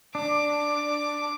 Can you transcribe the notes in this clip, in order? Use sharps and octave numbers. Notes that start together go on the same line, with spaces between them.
D4 D6